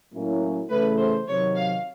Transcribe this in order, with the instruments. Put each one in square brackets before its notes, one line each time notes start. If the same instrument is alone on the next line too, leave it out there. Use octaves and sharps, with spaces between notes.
[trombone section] A2 F#3 A#3 C#4 E4
[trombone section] C#3 E3 A3 [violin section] B4
[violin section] C5
[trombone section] C3 D#3 F#3 [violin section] C#5
[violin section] F5